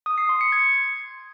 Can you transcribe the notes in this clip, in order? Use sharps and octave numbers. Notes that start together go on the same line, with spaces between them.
D#6
C7
C6
C#7
G#6